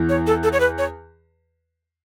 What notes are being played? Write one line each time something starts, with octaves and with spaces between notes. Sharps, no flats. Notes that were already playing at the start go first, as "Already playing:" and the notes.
Already playing: E2 E3
C#5
A4
A4
C#5
B4
C#5